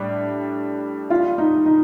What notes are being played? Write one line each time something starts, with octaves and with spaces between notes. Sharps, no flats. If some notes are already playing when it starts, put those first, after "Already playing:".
Already playing: A2 G3 D4
F4
D#4
D#4